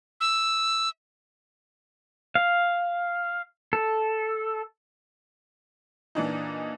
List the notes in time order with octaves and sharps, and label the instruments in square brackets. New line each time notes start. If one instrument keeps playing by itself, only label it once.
[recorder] E6
[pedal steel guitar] F5
A4
[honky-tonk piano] A#2 E3 D4 D#4